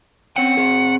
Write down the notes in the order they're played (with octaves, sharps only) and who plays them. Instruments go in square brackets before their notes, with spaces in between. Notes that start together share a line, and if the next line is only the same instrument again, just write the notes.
[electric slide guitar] C4 C#4 G5 [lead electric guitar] F#5
[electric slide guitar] C4 G#4